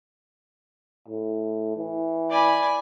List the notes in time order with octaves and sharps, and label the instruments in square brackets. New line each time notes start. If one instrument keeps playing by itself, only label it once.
[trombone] A2
E3
[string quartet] D5 G#5 B5